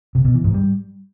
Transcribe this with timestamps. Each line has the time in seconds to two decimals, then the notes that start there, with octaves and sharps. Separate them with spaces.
0.15 C3
0.25 B2
0.34 E3
0.44 G#2
0.54 G3